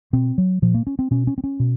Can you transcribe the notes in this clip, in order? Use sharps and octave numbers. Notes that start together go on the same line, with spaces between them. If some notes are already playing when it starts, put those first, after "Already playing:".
B2 C4
F#3
A#2 F3
A#3
C#4
C4
B2 C#4
C#4
C4
C#4
B2